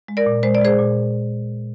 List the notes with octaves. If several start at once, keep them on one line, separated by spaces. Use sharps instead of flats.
G#3
A#4 D5
A#2
G#3 C5
D5
G#3 G#4 C5
A#2